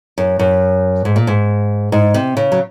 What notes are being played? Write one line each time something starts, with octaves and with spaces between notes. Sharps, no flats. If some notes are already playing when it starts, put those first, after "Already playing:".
F#2
F#2
G#2
A#2
G#2
G#2
C3
C#3
F#3